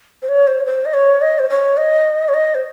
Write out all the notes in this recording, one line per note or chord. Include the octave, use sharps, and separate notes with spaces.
C5
C#5
C5
C#5
C5
D#5
C#5
D#5
C5
C#5
D#5
C#5
D#5
C5